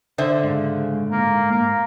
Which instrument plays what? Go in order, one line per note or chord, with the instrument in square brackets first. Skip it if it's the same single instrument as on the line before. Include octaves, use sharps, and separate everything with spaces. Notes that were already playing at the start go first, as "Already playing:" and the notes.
[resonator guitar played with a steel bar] D3 C5 E5
[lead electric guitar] G#2 [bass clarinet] C#3
[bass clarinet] A#3
A#3